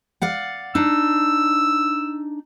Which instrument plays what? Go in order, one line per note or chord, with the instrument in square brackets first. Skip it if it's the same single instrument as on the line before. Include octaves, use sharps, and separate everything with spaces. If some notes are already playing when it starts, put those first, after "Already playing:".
[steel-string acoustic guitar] D5 F5 F#5
[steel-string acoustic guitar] D4 D#4 [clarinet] E6